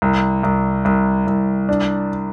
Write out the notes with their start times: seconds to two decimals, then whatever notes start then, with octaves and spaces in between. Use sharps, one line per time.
0.02 C2
0.43 C2
0.85 C2
1.27 C2
1.69 D4